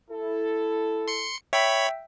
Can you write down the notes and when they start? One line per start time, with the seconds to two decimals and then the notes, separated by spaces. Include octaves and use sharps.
0.11 E4 A4
1.08 C6 C#7
1.53 C#5 E5 G5 B5 E6